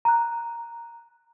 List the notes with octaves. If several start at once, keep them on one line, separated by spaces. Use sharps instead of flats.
A#5 F#6